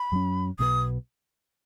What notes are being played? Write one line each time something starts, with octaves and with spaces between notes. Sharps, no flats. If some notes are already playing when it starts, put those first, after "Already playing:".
Already playing: B5
F#2 F#3 C#4
B1 B2 F#3 B3 D#6